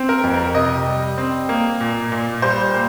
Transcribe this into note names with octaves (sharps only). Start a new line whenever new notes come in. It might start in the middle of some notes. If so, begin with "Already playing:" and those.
Already playing: C4
A#4
F2
A#4
C3 D#5
G3
C4
A#3
A#2
A#2
G3 C5
A#3